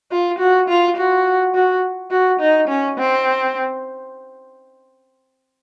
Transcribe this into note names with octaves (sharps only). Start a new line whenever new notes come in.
F4
F#4
F4
F#4
F#4
F#4
D#4
C#4
C4